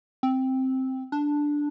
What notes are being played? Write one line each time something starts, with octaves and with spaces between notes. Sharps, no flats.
C4
D4